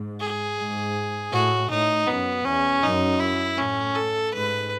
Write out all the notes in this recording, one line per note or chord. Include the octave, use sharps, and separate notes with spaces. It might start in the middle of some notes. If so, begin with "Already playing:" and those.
Already playing: G#2
G#4
G#2
A2 F#4
A2 D#4
F#2 B3
E2 C#4
F#2 D#4
E4
A2 C#4
A4
G#2 B4